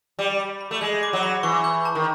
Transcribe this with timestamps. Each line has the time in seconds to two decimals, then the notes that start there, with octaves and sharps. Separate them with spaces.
0.19 G3 D6
0.40 B5
0.61 B5
0.71 A3
0.81 G#3 G6
1.03 D6
1.13 F#3
1.23 B5
1.43 E3 C#6
1.64 G6
1.85 A5
1.95 D#3